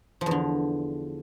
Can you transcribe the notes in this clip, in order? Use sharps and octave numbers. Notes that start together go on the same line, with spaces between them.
E2 D3 F3